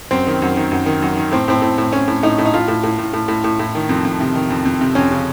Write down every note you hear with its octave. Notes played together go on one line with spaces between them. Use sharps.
F#2 C4
D#3
F#2
D#3
F#2
D#3
F#2
D#3
A2 C4
A2 C4
A2
A2
A2 C#4
A2
A2 D#4
A2
D#4
A2 F4
A2
A2
A2
A2
A2
A2
A2
D#3
F2
F2
C3
D#3
F2
F2
C3
F2 C#4
C#3